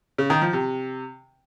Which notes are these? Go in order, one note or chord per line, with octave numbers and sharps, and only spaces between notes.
C#3
D#3
F3
C3